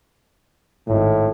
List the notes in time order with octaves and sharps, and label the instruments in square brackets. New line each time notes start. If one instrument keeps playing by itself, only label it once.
[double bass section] G#1 [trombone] A2